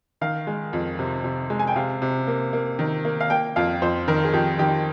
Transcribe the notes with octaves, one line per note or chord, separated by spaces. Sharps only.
D#3 F5
G#3
F2
C3
C3
G#3
G#5
G5
C3 F5
C3
A#3
A#3
D#3
A#3
F5
A#3 G5
F2 F5
F2 C5
D#3 A#4
G#4
F2 G4
D#3 G4